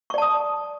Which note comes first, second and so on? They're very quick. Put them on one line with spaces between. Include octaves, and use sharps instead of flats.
C#6 D5 A5 D#6